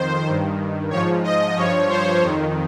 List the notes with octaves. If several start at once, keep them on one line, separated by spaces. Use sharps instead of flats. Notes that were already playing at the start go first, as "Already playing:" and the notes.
Already playing: F2 D#3 C5
G2 D#3
G#2 F3 C#5
D#5
G2 F3 C#5
C5
F2 D#3